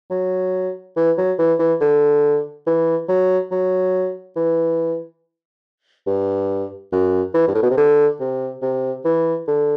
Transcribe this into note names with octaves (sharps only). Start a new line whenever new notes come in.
F#3
E3
F#3
E3
E3
D3
E3
F#3
F#3
E3
G2
F#2
E3
G2
A2
B2
C3
D3
C3
C3
E3
D3